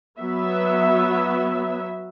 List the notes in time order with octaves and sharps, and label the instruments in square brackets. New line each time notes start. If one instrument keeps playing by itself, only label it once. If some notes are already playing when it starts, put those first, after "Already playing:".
[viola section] F#3 B3 E5